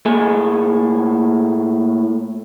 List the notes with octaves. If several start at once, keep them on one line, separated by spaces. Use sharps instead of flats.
A2 A#3 G#4 A4 G#5